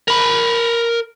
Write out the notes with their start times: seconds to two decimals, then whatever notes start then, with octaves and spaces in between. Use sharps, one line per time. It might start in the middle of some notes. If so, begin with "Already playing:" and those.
0.08 A#4 B5